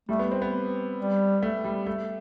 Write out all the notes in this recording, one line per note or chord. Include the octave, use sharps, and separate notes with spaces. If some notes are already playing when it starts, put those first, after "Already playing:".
G3 A3
B3
C4
B3
G3
A3
G3
A3